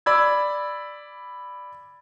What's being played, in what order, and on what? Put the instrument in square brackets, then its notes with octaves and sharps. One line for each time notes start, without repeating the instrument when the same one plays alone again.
[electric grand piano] D5 B5 E6 G#6